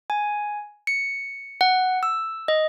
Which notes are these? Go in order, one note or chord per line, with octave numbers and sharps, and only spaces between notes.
G#5
C#7
F#5
E6
D#5